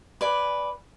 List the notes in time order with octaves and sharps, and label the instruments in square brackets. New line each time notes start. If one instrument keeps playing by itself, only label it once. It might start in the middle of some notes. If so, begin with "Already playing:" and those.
[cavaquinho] B4 D5 G#5